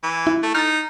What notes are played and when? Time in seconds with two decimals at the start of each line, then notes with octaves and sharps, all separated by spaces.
0.03 E3
0.27 E4
0.43 A3
0.54 D#4 F6 A6